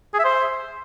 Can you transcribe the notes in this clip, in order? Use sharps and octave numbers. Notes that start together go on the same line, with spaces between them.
G#4
E5
C5